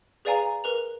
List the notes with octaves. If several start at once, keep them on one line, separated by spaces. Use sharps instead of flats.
G#4 B4 D5 F5 G#5 A#5
A#4 B4 F7